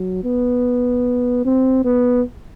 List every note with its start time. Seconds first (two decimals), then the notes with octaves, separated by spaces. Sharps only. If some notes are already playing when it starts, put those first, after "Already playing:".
Already playing: F#3
0.24 B3
1.45 C4
1.85 B3